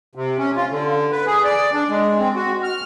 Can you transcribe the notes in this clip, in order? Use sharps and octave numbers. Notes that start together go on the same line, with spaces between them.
C3
C#4
F4
D3
B4
G#4
D5
D4
G#3
C4
F#4
F6